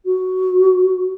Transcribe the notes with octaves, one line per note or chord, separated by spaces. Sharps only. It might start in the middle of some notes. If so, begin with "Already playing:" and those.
F#4